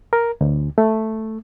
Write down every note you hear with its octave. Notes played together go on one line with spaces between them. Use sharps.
A#4
D2
A3